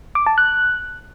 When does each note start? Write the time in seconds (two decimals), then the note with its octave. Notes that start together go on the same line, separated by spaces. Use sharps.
0.15 D6
0.26 A5
0.38 F#6